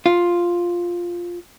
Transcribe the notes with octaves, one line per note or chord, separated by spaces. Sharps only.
F4